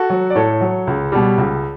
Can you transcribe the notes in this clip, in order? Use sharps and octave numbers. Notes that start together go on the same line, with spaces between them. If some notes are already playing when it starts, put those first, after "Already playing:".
Already playing: F#4 A4
F#3
D5
A2 A4 C#5
F#3
C#2
B2 G3
C#2